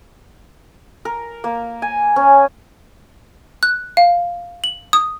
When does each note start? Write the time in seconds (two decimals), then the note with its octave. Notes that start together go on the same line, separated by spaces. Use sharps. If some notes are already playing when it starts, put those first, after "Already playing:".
1.05 A#4
1.44 A#3
1.82 G#5
2.16 C#4
3.63 F#6
3.97 F5
4.64 F#7
4.93 D#6